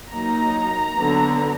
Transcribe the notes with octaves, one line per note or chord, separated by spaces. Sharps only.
F#3 A#3 D#4 A#5
D3 F#3 B3